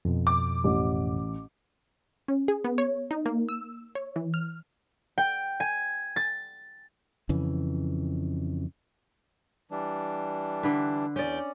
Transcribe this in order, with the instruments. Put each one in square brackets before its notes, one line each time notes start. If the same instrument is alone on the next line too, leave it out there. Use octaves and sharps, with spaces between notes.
[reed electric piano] F2 B2
[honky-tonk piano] D6
[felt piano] A1
[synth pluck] C#4
G#4
B3
C#5
D#4
A#3
E6
C#5
E3
F6
[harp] G5
G#5
A6
[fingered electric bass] F2 C#3 E3
[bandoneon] E3 G3 D4
[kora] D3 B4
[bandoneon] E2 D6 G6 [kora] C#4 D5